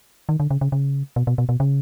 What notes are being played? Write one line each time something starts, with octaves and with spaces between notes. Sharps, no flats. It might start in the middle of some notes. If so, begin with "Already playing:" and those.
D#3
D3
C#3
C#3
C#3
B2
B2
B2
B2
C#3